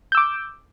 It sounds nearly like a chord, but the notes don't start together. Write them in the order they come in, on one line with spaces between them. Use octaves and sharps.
G6 E6 D6